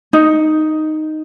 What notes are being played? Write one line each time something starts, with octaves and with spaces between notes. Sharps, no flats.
D#4